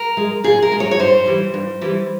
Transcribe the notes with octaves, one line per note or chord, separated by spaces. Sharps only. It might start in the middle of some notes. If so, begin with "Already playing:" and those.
Already playing: A#4
G#3
A#2 G#4
A#4
G#3
C#5
C#5
G2 C5
E3 G3
G2
E3 G3